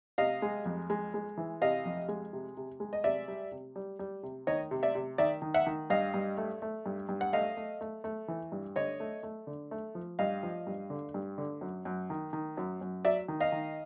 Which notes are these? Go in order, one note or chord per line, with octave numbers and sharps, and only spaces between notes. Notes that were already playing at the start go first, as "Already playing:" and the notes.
C3 D#5 F5
G#3
F2
G#3
G#3
E3
C3 D#5 F5
F2
G#3
C3
C3
G#3
D#5
C3 D5 E5
G3
C3
G3
G3
C3
D#3 C#5 D#5
C3
D5 E5
C3
D#3 D5 E5
D#3
E5 F#5
D#3
G2 D#5 F5
G2
A3
A3
G2
G2
F#5
A3 D#5 F5
A3
A3
A3
E3
G2
D3 C#5 D#5
A3
A3
D3
A3
F3
G2 D#5 F5
F3
G2
D3
G2
D3
F#2
F#2
D#3
D#3
F#2
F#2
F#3 D5 E5
D#3
D#5 F5
D#3